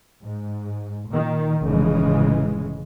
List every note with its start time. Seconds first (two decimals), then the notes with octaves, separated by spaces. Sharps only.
0.22 G#2
1.08 A#2 D#3
1.64 F1 A2 C#3 E3 G#3